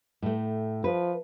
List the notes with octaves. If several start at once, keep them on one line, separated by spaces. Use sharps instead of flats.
A2 A3
F3 B4